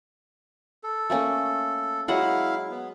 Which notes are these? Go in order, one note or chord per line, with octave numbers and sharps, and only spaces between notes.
A4
A3 A#3 C#4
F#3 G#3 E4 F5 F#5
B3